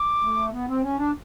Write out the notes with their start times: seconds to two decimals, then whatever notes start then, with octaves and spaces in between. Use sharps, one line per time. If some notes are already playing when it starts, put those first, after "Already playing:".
Already playing: D6
0.22 A3
0.52 B3
0.68 C4
0.83 C#4
0.97 D4